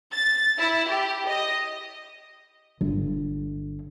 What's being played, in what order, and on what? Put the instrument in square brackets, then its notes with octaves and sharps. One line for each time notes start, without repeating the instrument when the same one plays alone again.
[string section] A6
E4
G4
D#5
[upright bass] G1